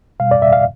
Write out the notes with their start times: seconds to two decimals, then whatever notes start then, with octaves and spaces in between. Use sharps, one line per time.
0.20 B2 G3 F5
0.31 D5
0.42 E5
0.53 F5